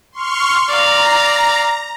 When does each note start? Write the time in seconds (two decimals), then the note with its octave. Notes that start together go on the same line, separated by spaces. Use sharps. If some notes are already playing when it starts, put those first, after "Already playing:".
0.12 C6 C#6 F6
0.69 D5 F5 A#5